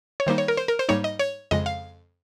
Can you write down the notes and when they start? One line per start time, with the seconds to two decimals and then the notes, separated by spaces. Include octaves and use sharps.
0.20 C#5
0.27 D#3 G3 A#3 D#4 C5
0.38 C#5
0.48 A#4
0.57 C5
0.68 A#4
0.79 C5
0.89 G#2 G3 A#3 D#4 C#5
1.04 D#5
1.19 C#5
1.51 F2 C#3 G#3 D#5
1.66 F5